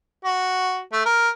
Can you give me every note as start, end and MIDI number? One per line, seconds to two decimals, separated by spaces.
0.25 0.81 66
0.92 1.03 57
1.05 1.29 70